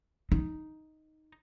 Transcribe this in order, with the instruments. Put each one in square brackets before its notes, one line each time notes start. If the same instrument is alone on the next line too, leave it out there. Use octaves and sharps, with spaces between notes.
[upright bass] D#4